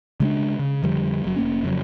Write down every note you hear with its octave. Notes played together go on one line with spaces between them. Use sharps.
C#3 G#3 A#3 D4
C#3
F2 D3 F3 G3
F#1 F#3
F1 A#3 C#4
F2 C#3 F#3